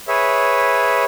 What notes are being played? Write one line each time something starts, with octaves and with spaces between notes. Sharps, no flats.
G#4 B4 C#5 E5